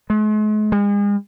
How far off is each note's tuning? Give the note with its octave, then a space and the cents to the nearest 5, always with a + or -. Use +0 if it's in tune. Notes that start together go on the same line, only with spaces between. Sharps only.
G#3 +45
G#3 -40